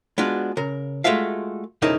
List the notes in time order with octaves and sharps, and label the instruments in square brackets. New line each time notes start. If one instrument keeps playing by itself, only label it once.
[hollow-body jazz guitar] G#3 B3 D4 F4 F#4
C#3 A#4
G#3 A3 F4 F#4 E5 F5
B1 F2 C#3 D#4 E4 A#4